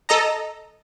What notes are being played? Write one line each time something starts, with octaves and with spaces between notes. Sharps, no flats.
A4 D#5 A#5